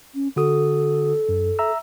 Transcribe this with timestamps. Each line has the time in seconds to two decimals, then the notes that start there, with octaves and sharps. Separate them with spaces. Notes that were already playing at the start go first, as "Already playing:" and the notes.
0.14 C#4
0.36 D3 F#4 A4 D#6
1.29 F#2
1.59 E5 A#5 E6